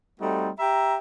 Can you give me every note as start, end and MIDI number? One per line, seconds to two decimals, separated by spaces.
0.20 0.49 55
0.20 0.49 57
0.20 0.49 60
0.20 0.49 63
0.20 0.49 66
0.59 0.96 67
0.59 0.96 76
0.59 0.96 82